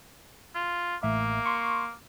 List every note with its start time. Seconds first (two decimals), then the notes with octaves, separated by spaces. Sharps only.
0.55 F4
1.03 A1 A2 A#3 E5
1.46 C6 C#6